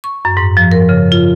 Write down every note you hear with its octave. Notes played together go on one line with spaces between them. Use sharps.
C#6
F#2
G#2
F3
A#4
C#3
F4